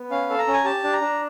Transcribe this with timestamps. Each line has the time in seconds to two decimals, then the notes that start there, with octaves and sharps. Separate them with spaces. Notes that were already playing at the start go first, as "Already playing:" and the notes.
Already playing: B3
0.10 C#4 F5
0.30 A4
0.38 A#5
0.47 C#4
0.54 G#5
0.65 G4 A5
0.84 D4
0.93 A#5
1.01 D4